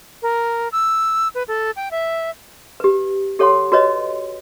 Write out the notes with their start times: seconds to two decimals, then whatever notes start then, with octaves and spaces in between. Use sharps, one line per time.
0.22 A#4
0.72 E6
1.35 B4
1.48 A4
1.76 G5
1.91 E5
2.80 G4 B4
3.39 G4 A4 C#5 F#5 C6
3.72 F#4 B4 C#5 D#5